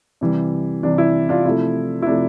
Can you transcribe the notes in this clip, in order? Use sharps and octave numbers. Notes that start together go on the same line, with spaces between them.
C3 E3 G3
C3 E3 G3 D4
E4
D4 F4
C3 F3 A3 E4
E4
C3 F3 A3 D4